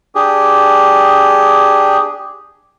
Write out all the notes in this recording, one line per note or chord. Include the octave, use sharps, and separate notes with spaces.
D4 G4 G#4